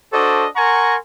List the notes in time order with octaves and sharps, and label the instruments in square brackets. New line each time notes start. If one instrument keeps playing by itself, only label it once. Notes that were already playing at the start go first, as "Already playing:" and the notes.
[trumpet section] D4 F#4 A4 C5 D5 D#5
A#4 F#5 G#5 A#5 C6 C#6